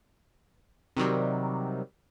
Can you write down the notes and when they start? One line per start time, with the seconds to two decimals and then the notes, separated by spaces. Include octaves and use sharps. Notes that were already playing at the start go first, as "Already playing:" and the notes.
0.97 C3 D#3 F#3 G3